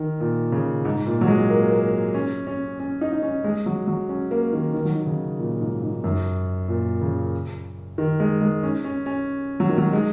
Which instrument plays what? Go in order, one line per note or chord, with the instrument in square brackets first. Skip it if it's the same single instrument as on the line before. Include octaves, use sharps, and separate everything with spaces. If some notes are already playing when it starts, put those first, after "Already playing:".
Already playing: [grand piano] D#3
A#2
C#3
G#2
A#2
F#3
G#3
A#3
A#3
C#4
C#4
C#4
D#4
D#4
C#4
G#3
F#3
F#3
C#4
A#3
D#3
D#3
F#3
D#3
C#3
A#2
G#2
G#2
F#2
A#2
C#3
D#3
G#3
G#3
C#4
C#4
C#4
F#3
D#3
F#3
G#3